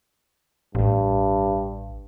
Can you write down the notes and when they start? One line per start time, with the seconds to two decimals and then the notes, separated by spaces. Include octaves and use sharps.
0.75 A1 G2